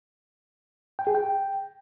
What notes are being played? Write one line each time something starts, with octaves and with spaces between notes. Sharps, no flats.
G5
G#4
G5